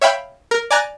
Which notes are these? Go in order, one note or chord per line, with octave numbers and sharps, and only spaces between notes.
C#5 E5 F5 G5 B5
A#4
D5 G#5 A#5 F#6 A6